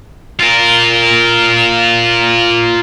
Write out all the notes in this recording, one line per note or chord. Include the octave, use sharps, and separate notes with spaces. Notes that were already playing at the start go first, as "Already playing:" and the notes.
F4 A#4